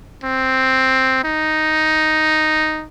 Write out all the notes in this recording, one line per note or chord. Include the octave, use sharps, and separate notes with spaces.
C4
D#4